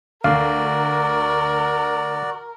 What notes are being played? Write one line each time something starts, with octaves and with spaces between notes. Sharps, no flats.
D2 F#4 A#4 D5 F5